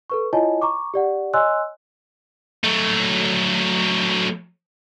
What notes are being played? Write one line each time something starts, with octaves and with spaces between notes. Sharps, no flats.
A4 B4 C#6
E4 F4 C#5 D#5 G#5 A5
A#5 C#6 D6
G4 D5 F#5
C#5 D#5 G#5 C6 E6 F#6
F#3 A3